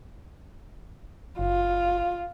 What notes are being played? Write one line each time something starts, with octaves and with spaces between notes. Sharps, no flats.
F#1 F4